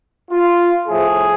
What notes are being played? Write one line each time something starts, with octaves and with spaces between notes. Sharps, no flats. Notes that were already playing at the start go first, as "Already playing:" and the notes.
F4
A2 F3 A3 G#4